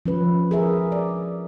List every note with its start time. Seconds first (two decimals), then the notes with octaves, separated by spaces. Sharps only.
0.06 F3 C#4 B4
0.51 G#4 A#4 E5
0.92 D5